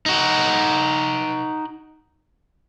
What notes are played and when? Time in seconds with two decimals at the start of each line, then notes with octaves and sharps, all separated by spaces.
0.06 D#4 F#4